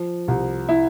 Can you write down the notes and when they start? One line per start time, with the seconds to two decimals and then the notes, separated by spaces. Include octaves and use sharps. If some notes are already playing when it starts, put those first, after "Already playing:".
Already playing: F3
0.28 C2
0.69 E4